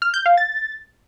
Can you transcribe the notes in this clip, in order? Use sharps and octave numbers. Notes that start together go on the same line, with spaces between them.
F6
G6
F5
A6